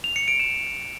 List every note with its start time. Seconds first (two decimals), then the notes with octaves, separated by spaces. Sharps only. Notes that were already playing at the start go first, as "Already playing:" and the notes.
0.04 F7
0.16 C#7
0.28 D7
0.40 E7